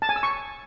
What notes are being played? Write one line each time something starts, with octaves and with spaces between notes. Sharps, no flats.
A5
G#5
E6
C#6